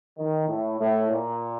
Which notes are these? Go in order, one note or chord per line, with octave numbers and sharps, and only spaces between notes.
D#3
A2
A2
A#2